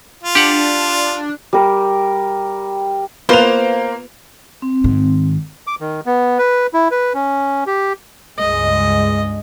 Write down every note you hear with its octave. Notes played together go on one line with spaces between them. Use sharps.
F4
D4 G4 F#5
G3 A#4
A#3 B3 F4 B4 C5 F7
C4
G#2 D#3
D6
D#3
B3
B4
E4
B4
C#4
G4
C#2 G2 G#3 D#5